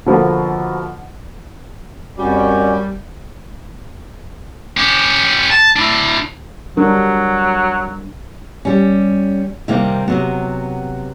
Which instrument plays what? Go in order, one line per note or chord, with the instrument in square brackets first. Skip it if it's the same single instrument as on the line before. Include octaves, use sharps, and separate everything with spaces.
[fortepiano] B2 D3 F3 A#3
[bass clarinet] F2 [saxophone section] G3 [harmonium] C#4 F#4 [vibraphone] A#4 D5
[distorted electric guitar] C#4 G4
A5
D4 E4
[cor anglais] F#3 [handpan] G3 D4 A#4
[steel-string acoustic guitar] G3 C#4
C3 D#3 G3 A#3 C4
C3 F#3 B3